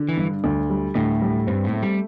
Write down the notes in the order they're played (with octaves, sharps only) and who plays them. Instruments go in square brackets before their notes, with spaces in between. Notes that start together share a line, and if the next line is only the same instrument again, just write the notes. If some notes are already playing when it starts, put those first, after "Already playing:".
Already playing: [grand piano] D3
[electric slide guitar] E3
[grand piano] G2
D2
G3
[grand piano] D2 [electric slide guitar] A2
[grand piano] G3
[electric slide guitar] G2 [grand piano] C4
[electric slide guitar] A2
[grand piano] A3
[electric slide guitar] G3